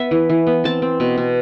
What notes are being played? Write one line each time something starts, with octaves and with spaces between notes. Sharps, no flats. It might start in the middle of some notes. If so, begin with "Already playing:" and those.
Already playing: B3 E5
E3
E3
B3
C4 A5
C4
B2
B2